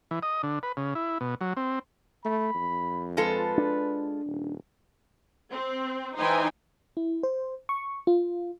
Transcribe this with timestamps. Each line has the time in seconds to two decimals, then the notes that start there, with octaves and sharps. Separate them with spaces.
0.11 E3
0.23 D#5
0.43 D3
0.63 B4
0.77 C#3
0.95 E4
1.21 B2
1.41 F#3
1.57 C4
2.25 A3 B5
2.55 F2
3.17 G#3 F4 A4 B4
3.58 D4
4.26 D#1
5.51 C4
6.17 E3 D#4 C5 G5 G#5
6.97 E4
7.23 C5
7.69 C#6
8.07 F4